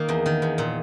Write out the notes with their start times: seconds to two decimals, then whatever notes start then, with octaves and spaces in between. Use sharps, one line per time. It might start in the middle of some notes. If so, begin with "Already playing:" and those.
Already playing: D#3 A#3
0.09 E2
0.26 D#3
0.42 E2
0.58 A#2